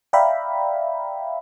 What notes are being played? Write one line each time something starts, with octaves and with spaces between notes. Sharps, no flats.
D5 E5 F5 G5 A#5 B5